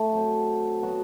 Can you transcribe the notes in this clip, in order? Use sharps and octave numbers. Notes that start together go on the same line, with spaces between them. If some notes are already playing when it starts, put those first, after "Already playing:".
Already playing: A3 E4
D3 F#3 C4
F#3 B3 F#4